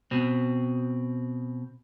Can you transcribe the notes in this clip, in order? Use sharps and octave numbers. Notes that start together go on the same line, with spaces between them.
B2 C4